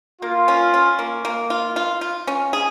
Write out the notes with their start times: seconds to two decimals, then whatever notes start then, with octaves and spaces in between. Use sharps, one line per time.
0.22 A#3 F4
0.48 C#4
0.74 C#4
0.99 A#3
1.25 A#3
1.50 F4
1.76 F4
2.01 F4
2.27 C#4
2.53 G#4